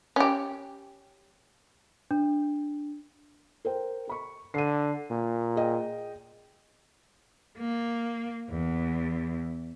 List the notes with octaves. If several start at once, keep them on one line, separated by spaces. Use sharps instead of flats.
C#4 G4
D4
A#4 C5 G5
A4 B5 C#6
D3 C7 D#7
A#2
G#4 D#5 G5
A#3
E2